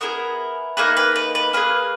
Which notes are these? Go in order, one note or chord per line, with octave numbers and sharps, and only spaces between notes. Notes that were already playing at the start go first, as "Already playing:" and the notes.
B3 E4 G#4 A#4
A#3 D#4 G#4 B4
B4
B4
B4
A#3 D#4 G#4 B4